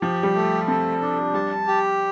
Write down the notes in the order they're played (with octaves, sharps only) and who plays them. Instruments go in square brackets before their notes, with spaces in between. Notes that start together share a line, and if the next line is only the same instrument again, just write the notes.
[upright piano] F3 [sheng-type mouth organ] G4
[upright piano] G3
[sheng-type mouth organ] A3
[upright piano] C4 [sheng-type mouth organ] A4
[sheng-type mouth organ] D4
[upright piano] G3 [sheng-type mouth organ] A5
[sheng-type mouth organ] G4